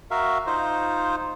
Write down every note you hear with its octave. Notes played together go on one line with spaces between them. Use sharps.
F#4 A#4 E5 F5
D#4 F4 C5